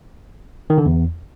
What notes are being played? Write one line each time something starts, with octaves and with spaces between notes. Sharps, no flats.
D#3
D3
E2